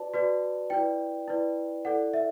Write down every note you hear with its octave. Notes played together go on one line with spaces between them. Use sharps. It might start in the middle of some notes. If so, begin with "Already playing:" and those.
Already playing: F#4 B4 D5 A5
F#4 B4 D5
E4 B4 D5 G5
E4 B4 D5
E4 A4 D5 F#5
E5